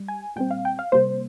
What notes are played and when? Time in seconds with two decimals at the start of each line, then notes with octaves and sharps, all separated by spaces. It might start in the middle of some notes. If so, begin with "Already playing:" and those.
Already playing: G3
0.08 G#5
0.36 A#2 G3 C4 G5
0.51 F5
0.65 G5
0.79 F5
0.92 C3 G3 A#3 C5